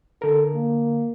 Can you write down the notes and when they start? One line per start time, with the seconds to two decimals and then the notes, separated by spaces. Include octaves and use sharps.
0.22 D3 A4 A#4
0.54 A#3